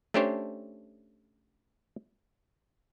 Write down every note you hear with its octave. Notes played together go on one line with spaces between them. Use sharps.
A3 C#4 D4 G4 C5 C#5